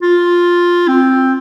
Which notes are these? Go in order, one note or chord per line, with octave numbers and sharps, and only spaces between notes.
F4
C4